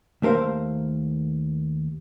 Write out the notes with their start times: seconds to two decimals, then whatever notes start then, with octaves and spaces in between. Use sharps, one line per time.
0.22 D#2 A3 A#4 C5 F5